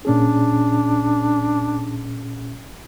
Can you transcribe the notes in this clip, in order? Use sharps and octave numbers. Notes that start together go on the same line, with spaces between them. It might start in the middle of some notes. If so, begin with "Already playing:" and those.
A#2 C#4 D4 G#4